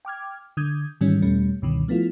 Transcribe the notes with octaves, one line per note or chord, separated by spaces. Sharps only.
G5 D6 F6 G#6
D3 D#6 G6 G#6
G#2 D#3 E3 G3 G#3 C#4
E2 B2 G3 A3 C#4
C#2 G2 B2 D3 D#3
F3 A3 B3 E4 F4